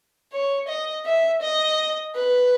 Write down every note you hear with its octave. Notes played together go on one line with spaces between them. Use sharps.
C#5
D#5
E5
D#5
B4